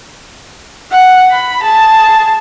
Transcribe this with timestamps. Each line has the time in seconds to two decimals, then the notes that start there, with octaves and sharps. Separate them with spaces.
0.92 F#5
1.31 B5
1.62 G#4 A5